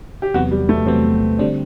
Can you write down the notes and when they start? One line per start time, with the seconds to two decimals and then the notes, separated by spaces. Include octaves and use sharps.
0.22 G4
0.34 E2 C3 F#3 B3 F#4
0.51 G3
0.69 A3
0.86 E2 C3 F#3 B3 C4
1.39 D3 G3 C4 D4